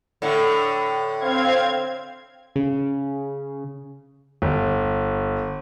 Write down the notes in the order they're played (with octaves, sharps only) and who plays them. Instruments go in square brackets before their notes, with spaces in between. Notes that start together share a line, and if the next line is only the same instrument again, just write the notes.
[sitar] A2 D3
[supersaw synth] C4 F5 G#6
[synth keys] C#3
[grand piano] G1